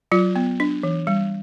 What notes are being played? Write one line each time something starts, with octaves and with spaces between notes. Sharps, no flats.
F#3 F4
B3
D4
E3
G3